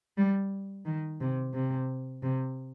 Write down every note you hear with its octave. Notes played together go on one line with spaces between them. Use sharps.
G3
D#3
C3
C3
C3